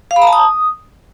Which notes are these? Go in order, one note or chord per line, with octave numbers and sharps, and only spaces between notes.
F5
B5
A#5
A5
D#6